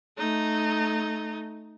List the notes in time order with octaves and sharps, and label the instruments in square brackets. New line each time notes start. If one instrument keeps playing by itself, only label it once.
[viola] A3 D#4